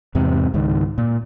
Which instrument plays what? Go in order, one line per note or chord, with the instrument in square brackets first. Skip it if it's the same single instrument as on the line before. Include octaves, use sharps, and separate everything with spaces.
[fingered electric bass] E2 G#2 C3
C#2 G#2 D#3
A#2